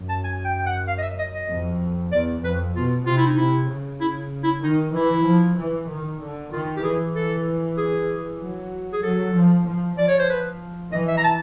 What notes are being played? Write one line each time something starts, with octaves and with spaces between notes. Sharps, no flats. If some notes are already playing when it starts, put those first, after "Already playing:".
Already playing: F#2
A5
G#5
G5
G5
F#5
F5
D#5
E5
D#5
D#5
F2
E2 D5
F2 B4
B2 F4
C3 F4
E4
D#4
C3 E4
C#3
E4
E4
D#3 D#4
E3 E4
F3
E3
D#3
D3
D#3 F4
G4
E3 G#4
A4
G#4
F#3
G#4
F#3 A4
F3
F3
F3 D5
C#5
C5
B4
E3 D#5
E5
A#5
A5